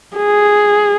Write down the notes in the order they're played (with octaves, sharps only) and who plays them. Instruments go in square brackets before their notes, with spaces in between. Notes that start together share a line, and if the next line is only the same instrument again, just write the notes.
[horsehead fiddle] G#4